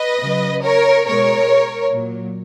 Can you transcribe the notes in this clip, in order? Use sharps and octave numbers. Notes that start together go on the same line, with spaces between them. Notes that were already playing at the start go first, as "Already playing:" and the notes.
Already playing: B4 D#5
C#3 F#3
A#4 C#5
B2 G#3 A#4 C#5
A#2 F#3